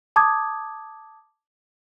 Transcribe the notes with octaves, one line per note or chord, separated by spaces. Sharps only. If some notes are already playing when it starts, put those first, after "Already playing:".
A5 D6 D#6 G#6